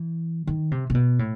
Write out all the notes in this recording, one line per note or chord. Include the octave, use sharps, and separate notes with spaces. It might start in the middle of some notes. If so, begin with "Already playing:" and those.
Already playing: E3
D#3
C3
C3
B2
A2